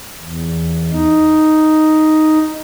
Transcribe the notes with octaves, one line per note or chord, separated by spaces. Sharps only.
E2
D#4